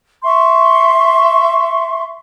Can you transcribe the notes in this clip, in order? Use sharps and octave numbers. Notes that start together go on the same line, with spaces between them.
E5 C6 C#6